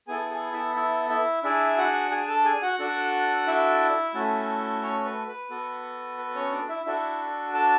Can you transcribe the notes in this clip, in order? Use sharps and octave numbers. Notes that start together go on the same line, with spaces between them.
B3 E4 G#4 A4 G#5
G#4 G#5
E4 E5
E4 E5
E4 E5
D4 E4 G#4 E5
F#4 F#5
G#4 G#5
A4 A5
G#4 G#5
F#4 F#5
D4 F#4 A4
E4 E5
A3 C#4 F#4 A4
C#4 C#5
B4
B4
B3 F#4 A4
B4
C#4 C#5
D4 D5
E4 E5
D4 E4 F#4 A4 E5
A4 A5